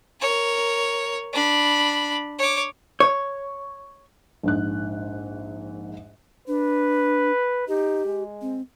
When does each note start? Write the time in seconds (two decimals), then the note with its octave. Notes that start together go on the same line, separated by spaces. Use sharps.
0.20 A#4 C#5
1.33 D4 B5
2.39 C#5 D6
3.00 C#5
4.43 A#1 G#2 F#6
6.48 D4 B4
7.68 D#4 G4
8.06 G#3
8.42 C4